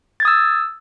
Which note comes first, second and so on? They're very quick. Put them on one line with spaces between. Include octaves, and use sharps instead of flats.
A6 G#6 D#6 E6